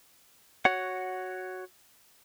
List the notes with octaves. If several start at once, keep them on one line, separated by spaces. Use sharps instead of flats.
F#4 C#5 F#5